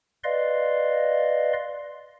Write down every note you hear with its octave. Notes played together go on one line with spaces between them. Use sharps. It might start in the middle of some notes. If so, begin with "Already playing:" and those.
B4 D5 D#5 F5 C6